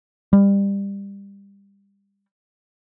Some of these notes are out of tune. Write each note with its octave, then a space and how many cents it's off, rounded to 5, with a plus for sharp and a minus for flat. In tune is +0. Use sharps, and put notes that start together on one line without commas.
G3 +25